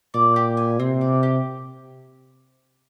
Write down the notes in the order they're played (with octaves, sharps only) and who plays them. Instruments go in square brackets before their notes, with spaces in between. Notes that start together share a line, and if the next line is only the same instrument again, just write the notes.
[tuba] A#2 [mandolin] D5
[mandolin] G4
G#5
[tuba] C3 [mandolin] C4
[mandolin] D5
G4